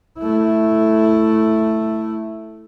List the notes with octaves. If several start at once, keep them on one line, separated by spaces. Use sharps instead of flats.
A3 E4